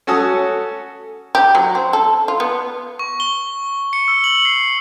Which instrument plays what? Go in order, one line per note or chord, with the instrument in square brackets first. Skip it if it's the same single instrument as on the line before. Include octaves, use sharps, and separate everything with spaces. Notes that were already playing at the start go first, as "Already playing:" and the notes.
[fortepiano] C#4 F#4 A4 G#5 D#6
[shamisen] G4
F#3
C4
A4
F4
B3
[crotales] C#6
G7
C#7
E6
F#7
C7